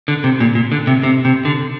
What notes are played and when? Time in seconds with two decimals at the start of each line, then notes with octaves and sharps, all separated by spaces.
0.08 D3
0.24 C3
0.40 A#2
0.55 A#2
0.72 D3
0.87 C3
1.03 C3
1.25 C3
1.45 D3